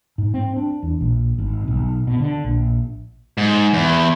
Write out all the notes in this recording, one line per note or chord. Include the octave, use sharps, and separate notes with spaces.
G#2
C4
D4
E2
A#1
G#1
B1
B2
D3
A#1
G#2
E2